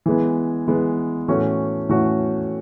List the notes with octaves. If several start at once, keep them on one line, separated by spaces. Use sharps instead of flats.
E3 G#3 B3
E3 G#3 B3
A2 E3 A3 C#4 F#4
A2 E3 A3 C#4 F#4